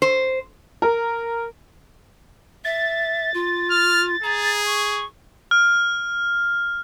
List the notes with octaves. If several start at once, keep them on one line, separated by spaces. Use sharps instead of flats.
C5
A#4
E5 A6
F4
F6
G#4 A#5
C#6
F6